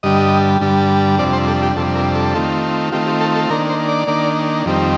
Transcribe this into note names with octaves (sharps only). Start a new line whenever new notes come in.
G2 D3 G3 D#5
G2 D3 G3
F2 C3 G3 D4 D5
C5
A4
G4
F2 C3 G3 D4 A4
A#4
A4
D#3 A3 C4 F4
D#3 A3 C4 F4 G4
G4
A4
A4
D#3 A#3 D4 A#4
C5
D5
D#3 A#3 D4
F2 D#3 G3 C4